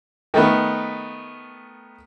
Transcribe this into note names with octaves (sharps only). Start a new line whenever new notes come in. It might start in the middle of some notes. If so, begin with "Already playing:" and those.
D#3 A3 B3